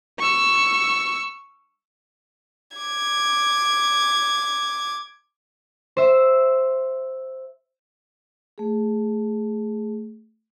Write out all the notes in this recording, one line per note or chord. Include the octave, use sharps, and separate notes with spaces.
C#6 E6
D6 G#6
C5 E5
A3 G#4